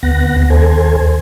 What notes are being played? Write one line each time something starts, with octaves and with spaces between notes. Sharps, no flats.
D2 B3 F#5 A#6
D#2 A4 C5 G#5